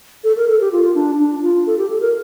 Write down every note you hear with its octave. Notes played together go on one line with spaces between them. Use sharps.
A4
A#4
A4
G4
F4
D4
D4
F4
A4
G4
A4
A#4